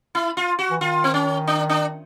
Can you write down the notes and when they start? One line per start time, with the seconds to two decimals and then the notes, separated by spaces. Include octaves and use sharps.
0.15 E4
0.37 F4
0.59 F#4
0.71 E3
0.80 D#3 F4
1.04 C4
1.14 C#4
1.47 D4
1.69 D4